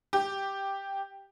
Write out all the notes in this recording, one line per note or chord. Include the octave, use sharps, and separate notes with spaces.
G4